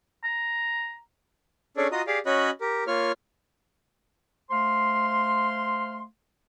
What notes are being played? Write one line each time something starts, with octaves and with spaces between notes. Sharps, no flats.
A#5
C#4 D4 G#4 A4 C#5 D5
F4 F#4 D#5 A#5 D#6
G4 G#4 D5 F5
C#4 F#4 C#5 D#5 B5 F#6
G4 A#4
A#3 F4 C#5 F6
A3 C5 F5 C6